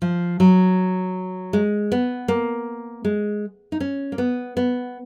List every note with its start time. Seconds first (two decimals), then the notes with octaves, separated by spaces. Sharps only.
0.02 F3
0.40 F#3
1.53 G#3
1.92 B3
2.28 A#3
3.04 G#3
3.72 D#4
3.80 C#4
4.12 A#3
4.18 B3
4.57 B3